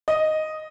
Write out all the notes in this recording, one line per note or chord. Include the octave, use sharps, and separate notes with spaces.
D#5